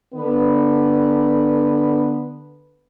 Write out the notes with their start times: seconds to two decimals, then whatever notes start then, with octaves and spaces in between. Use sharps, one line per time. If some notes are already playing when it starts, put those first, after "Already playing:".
0.14 D3 B3 B4